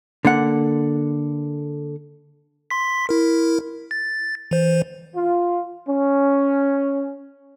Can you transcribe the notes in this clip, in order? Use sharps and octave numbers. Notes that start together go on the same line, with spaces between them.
D3 A#3 F#5
C6 B6
E4 A#4
A6
E3 C5
F4
C#4